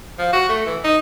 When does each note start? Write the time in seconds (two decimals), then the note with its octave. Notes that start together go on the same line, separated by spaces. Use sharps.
0.19 F3
0.33 F#4
0.49 A3
0.66 E3
0.84 D#4